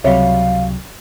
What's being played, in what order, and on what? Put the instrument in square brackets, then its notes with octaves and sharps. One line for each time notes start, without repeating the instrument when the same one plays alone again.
[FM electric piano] C#2 C3 F#3 [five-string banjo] G3 C#5 E5 [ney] F5